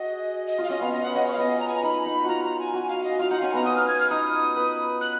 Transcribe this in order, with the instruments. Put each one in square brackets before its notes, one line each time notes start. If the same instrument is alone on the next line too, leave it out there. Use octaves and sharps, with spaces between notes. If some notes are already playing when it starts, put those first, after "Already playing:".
Already playing: [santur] F#4 G#4 [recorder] D#5
[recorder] D#5
[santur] F4
[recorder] F5
[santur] C#4 [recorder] D#5
[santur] B3 [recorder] F5
[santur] C#4 [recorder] D#5
[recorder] F#5
[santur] C#4 [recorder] D#5
[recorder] C#5
F5
[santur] B3 [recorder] D#5
[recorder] A#5
G#5
A#5
[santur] D#4 [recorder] B5
[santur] D#4
[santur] F4 F#4 [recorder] A#5
[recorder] A#5
G#5
[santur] F#4 [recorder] G#5
[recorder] F5
D#5
[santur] F4 [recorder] F5
[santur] D#4 [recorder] F#5
[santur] C#4 [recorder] G#5
[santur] B3 [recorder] A#5
[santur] C#4 [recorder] D#6
[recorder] F6
G#6
F6
[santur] D#4 [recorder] D#6
[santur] B4
[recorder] F#6